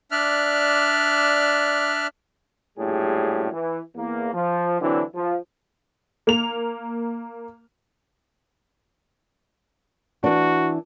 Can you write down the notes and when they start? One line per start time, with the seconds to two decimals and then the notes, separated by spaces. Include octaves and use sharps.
0.11 D4 D5 E5 F6 F#6
2.78 A#1 F#2 A2 G3 G4 G#4
3.53 E3
3.96 E2 A#3
4.33 F3
4.81 D3 E3 F#3 C4 D4 E4
5.14 F3
6.27 A#3 F7
10.24 E3 D4 F#4